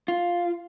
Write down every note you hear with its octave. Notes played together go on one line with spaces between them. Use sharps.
F4